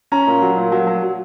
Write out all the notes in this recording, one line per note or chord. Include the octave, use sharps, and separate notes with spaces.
C#4 A#5
A#2
F#3
A#2
F#3
F#3
F#3